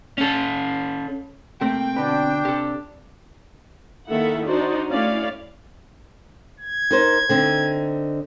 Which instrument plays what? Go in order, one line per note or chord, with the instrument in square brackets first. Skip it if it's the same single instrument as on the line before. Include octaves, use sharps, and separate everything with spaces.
[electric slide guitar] C#4 A4
[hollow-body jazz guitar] C3 A3 A#3 [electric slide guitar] C4 [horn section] G5
[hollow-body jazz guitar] B2 D3 B4 [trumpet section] D4
[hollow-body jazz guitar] C3 [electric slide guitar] G4 A4
[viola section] D#3 A#3 E4 A4 E5 F#5
D4 D#4 F#4 C5 D5
A3 C#4 E4 C#5 D5 F5
[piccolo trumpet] G#6
[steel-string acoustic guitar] D#4 A#4 C5
D3 C4 D#4